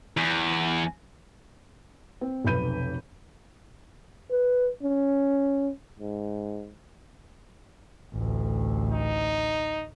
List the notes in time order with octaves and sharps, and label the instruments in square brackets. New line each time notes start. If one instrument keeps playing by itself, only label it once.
[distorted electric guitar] E2
[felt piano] C4
F1 B1 B4 B5 G6 D#7
[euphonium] B4
C#4
G#2
[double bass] A1 D2
[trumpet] D#4